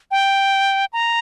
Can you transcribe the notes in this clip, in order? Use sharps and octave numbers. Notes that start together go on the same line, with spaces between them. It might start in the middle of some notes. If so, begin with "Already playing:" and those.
G5
A#5